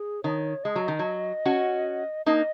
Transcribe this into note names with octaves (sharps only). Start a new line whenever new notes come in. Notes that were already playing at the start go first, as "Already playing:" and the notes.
Already playing: G#4
D#3 C#5
G#3 D#5
F#3
D#3
F#3
C#4 F#4
A#3 D#4 D#5